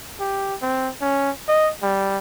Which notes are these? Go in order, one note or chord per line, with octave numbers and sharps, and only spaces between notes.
G4
C4
C#4
D#5
G3